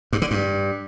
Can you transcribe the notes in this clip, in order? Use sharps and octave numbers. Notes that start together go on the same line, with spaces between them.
G2
D3
G2